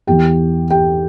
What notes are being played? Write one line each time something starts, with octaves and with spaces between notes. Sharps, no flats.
E2 E3 G4 G5
G4 G5